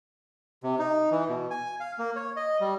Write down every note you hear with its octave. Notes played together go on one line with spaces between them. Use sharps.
C3
D#4
E3
B2
G#5
F5
A#3
C#5
D#5
G3